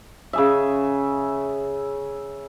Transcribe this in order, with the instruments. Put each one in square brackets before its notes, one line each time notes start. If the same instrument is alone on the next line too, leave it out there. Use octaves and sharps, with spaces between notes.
[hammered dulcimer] C#3 G#4 E5